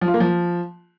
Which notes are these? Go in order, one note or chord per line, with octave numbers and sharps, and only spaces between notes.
F3
F4
A#3
F3